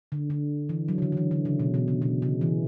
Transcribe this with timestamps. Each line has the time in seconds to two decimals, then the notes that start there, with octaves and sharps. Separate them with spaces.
0.12 D3
0.30 D3
0.69 E3
0.88 F#3
0.98 C#3
1.02 D3
1.12 D3
1.17 E3
1.31 D3
1.45 C#3
1.60 B2
1.74 B2
1.88 C#3
2.02 B2
2.22 C#3
2.41 E3